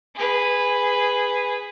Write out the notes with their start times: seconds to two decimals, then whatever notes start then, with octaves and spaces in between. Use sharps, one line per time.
0.15 G#4 B4